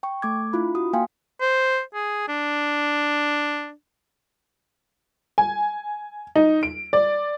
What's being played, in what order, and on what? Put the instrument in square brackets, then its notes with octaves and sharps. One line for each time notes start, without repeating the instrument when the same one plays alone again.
[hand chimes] G5 C#6
A3 D6 G#6
D4 E4 F4 B5
F#4 D#6
A#3 F5 G5 G#5 C6
[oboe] C5
G#4
D4
[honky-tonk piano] G#5
D#4
D7
D5